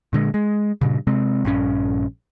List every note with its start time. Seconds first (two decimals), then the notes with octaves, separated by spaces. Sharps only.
0.13 A#2 D3 G#3
0.34 G#3
0.81 G2 A#2 C#3
1.07 C3 G#3 C4
1.45 A#1 G2 C#4